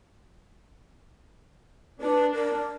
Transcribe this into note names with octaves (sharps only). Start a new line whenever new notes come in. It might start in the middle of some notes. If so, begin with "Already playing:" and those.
D4 B4
A#4